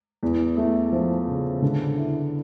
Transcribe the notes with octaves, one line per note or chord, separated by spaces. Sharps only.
E2
A3
F3
C#3
D3
E4